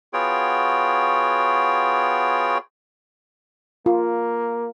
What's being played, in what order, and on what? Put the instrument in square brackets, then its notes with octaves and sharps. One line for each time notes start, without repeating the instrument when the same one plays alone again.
[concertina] B3 F4 F#4 G#4 C#5 G5
[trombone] A#3 [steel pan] F4